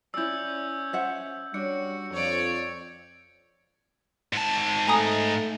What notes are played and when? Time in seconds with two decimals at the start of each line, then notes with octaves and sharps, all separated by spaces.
0.14 C#4 E4 D5 E6 G6
0.93 C5 E5 F#5
1.54 G3 D4 F#4 C#5 C#7
2.12 F2 C#5 D5
4.33 G#2 A5
4.88 A3 G#5 A#5 D#6